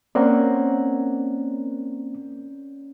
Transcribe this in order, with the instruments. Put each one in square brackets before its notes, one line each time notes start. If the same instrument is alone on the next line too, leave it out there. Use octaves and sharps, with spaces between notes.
[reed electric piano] A#3 C4 [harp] C#4 A#4 F#5 [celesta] D5